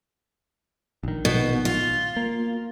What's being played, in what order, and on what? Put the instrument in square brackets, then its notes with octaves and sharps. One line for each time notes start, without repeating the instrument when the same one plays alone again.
[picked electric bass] A#1 D#3
[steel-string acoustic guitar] B2
F4
[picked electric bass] A#3